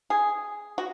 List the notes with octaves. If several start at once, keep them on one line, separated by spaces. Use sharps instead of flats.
G#4
F#4